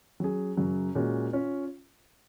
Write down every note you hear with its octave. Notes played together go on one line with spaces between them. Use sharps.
F#3 C#4 G#4
F#2 C#3 F#3
A#2 G#3 C#4 F#4
C#4 F4